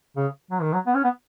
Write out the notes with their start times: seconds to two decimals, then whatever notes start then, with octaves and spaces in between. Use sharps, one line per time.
0.16 C#3
0.51 F#3
0.62 D#3
0.73 F#3
0.87 B3
0.95 C#4
1.04 B3